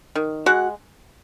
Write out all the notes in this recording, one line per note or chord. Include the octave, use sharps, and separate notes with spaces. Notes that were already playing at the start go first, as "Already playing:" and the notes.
D#3
G#3 F#4 F#5